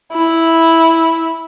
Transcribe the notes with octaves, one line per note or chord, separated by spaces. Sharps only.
E4